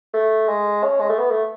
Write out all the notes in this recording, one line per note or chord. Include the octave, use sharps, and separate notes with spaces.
A3
G#3
C#4
G#3
A3
B3
A3